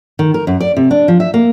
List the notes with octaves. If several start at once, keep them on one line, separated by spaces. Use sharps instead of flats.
D#3
A#4
F#2
D5
C3
D4
F3
E5
A#3